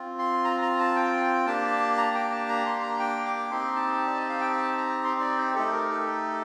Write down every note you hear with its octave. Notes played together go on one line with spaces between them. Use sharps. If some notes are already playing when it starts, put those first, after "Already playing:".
Already playing: C4 F4
C6
A#5
A#5
A5
G5
A#3 D4 G4 A5
A#5
G5
A5
A#5
C6
A#5
G5
D6
C4 D#4 G4 C6
A5
D5
D#5
F5
G5
A5
A#5
C6
D5
C5
A3 D#4 G4 A4
A#4
A4